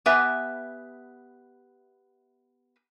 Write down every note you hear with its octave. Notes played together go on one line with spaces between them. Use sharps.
B3 G4 B4 E5 G#5